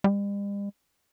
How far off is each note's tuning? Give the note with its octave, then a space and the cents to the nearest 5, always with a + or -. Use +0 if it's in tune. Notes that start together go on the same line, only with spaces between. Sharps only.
G3 +45